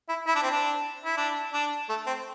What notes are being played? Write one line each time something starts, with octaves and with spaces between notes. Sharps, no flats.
E4
E4
D4
C4
D4
E4
D4
D4
A3
C4